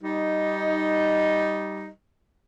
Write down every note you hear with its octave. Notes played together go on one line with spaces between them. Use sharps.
G3 D#4